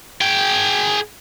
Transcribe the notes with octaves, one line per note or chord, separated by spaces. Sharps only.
G#4 G5